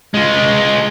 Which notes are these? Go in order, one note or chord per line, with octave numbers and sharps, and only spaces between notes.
G#3 F4